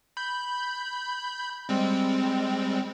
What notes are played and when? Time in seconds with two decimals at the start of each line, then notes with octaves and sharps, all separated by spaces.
0.17 B5 G6
1.69 G3 G#3 C4